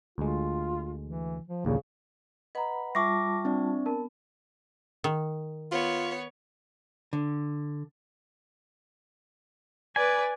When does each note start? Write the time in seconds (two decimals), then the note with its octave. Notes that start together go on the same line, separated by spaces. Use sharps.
0.18 D2 G#3 F4
1.04 E3
1.47 F3
1.65 A#1 D#2 A#2 C#3
2.55 B4 D#5 F#5 A#5 B5
2.95 G3 F4 E5 A5 C#6 D6 A#6
3.45 C4 D4 D5
3.86 B3 A#4 A5
5.04 D#3
5.72 B3 F4 C#5
7.13 D3
9.96 B4 D5 G#5